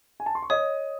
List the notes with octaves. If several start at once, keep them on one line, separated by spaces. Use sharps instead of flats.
G#5
A5
C6
C#6
C#5 D#5 D#6